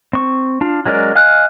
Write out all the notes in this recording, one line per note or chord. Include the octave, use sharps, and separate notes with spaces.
C4 C#6
D4 F4
F#3 G#3 C#4 A#4 D5
D#5 F5 G#5 F6 F#6